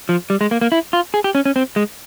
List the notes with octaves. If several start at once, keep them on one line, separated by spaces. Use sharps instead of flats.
F3
G3
G#3
A#3
A#3
E4
F4
G#4
G4
C#4
C#4
C4
G#3